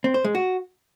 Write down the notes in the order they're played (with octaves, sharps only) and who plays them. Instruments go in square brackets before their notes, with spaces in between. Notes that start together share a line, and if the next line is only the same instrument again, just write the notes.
[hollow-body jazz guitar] C4
C5
G#3
F#4